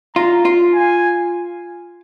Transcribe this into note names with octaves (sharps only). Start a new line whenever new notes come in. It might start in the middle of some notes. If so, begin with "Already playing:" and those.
F4 A#5
F4
G#5